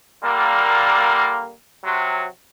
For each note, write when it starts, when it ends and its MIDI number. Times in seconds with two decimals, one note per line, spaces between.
0.24 1.51 50
0.24 1.51 55
0.24 1.51 58
1.84 2.26 48
1.84 2.26 54